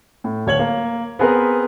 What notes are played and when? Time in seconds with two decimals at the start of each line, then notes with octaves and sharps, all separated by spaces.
0.24 A2
0.47 D1 C#5 G#6 F#7
0.59 A#3
1.19 B3 C4 G#4 A#4 B4